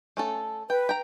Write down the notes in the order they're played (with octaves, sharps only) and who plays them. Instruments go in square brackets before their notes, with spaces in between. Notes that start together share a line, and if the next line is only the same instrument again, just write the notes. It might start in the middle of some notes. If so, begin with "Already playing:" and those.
[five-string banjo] A3 C#4 A4
[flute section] B4 [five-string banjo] G5
[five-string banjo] G5 A#5